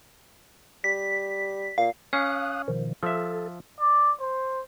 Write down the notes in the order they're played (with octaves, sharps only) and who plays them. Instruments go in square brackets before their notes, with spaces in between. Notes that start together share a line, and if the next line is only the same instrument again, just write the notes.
[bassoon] G3 [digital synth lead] B6
[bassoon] A#2 [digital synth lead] F5
[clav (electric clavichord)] C#4 [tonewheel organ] F5 D#6 F#6
[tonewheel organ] B2 D#3 F3
[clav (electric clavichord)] F3 E5 [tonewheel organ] A4
[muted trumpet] D5
C5